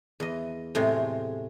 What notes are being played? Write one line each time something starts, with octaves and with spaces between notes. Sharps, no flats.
E2 D#5
A2 C3 G#3